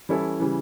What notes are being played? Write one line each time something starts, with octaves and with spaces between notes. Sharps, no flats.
E3 G3 C#4 E4 A4
C#3 E3 G3